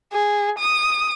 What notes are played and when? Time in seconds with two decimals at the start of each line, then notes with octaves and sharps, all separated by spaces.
0.13 G#4
0.58 D#6